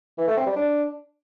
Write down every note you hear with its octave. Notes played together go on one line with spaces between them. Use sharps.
E3
A3
C4
G3
D4